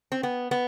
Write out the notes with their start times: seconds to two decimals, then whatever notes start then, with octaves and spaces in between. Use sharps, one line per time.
0.12 C4
0.23 B3
0.51 B3